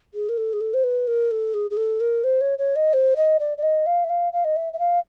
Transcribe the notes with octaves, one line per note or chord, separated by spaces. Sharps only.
G#4
A#4
A4
G#4
A4
C5
B4
A#4
A4
G#4
G#4
A4
A#4
C5
C#5
C#5
D#5
C5
D#5
D5
D5
D#5
F5
E5
F5
F5
D#5
E5
E5
F5